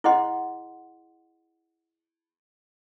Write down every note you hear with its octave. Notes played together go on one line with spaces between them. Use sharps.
E4 G#4 D#5 F#5 C6